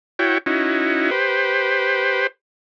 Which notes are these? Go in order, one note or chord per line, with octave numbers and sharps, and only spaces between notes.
E4 F#4 C#5 G5
C#4 D#4 E4 F#4
G4 B4 C5